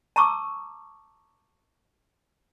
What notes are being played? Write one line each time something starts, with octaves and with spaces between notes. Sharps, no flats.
A5 A#5 C#6 D6 E6